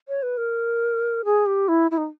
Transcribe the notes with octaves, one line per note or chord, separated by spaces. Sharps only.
C#5
B4
A#4
G#4
G4
E4
E4
D#4